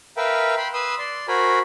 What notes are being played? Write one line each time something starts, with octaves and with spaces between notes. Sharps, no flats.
A#4 B4 E5 F5 G5
G5 B5 C6
B4 C6 D#6 E6
D5 C6
F#4 A#4 C5 G#5 B5